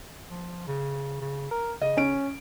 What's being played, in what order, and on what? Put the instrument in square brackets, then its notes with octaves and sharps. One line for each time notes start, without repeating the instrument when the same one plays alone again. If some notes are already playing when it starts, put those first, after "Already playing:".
[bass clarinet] F3
C#3
C#3
A#4
[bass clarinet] C#3 [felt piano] D#5
[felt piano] C#4 D7